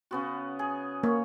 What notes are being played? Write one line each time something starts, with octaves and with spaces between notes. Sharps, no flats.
C#3 B3 F#4
G#4
A#3 C#5